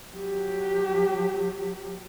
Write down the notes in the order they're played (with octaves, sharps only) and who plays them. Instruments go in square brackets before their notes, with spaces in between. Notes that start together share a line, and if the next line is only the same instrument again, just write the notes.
[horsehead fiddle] F#3 G4